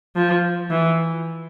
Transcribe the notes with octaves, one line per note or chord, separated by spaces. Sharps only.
F3
E3